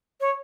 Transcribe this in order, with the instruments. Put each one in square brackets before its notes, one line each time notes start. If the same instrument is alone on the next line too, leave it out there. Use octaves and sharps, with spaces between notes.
[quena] C#5